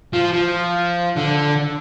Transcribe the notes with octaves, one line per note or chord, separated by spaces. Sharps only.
F3
F3
D3